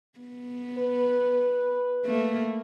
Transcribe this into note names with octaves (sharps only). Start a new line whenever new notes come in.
B3
B4
A3 A#3